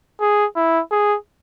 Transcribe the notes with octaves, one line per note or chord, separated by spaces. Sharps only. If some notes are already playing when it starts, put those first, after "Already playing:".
G#4
E4
G#4